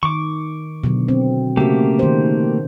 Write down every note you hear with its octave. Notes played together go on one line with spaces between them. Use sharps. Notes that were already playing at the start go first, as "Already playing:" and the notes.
D#3 C#6 D6
B2 D3 F#3
C4
C#3 A3 A#3 F#4 G4
D#3 C5